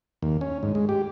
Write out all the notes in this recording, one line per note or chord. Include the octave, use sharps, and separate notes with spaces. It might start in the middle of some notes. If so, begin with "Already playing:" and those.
D#2
C#4
G#2
G#3
G4